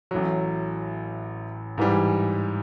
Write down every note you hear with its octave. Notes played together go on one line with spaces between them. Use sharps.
A1 A2 F#3
G#2 E3 G3